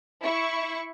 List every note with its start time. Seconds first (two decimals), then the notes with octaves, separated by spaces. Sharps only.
0.23 E4 C#6